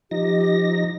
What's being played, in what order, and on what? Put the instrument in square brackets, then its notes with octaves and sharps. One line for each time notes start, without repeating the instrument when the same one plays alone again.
[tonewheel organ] F3 D#4 A#6 [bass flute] G4